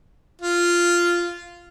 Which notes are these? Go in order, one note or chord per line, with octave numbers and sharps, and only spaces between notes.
F4